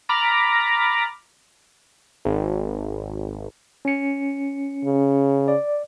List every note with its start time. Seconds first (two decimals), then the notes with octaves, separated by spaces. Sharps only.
0.09 A#5 B5 D6 F6 A6 A#6
2.25 G#1
3.85 C#4 C#7
4.85 C#3
5.48 D5